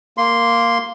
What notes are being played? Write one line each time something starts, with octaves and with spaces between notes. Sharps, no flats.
A#3 C6